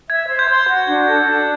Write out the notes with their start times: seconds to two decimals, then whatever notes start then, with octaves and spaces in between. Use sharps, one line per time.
0.09 E5 G#6
0.29 C5
0.39 G6
0.49 C6
0.68 F#4
0.86 D4
1.07 A4
1.25 D4